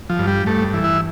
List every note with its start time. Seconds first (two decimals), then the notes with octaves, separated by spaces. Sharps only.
0.10 F3
0.19 G2
0.28 G3
0.46 G2 A3
0.74 E3
0.84 E4